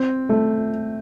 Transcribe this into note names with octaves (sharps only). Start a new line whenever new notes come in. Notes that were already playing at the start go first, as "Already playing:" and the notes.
Already playing: C4
A3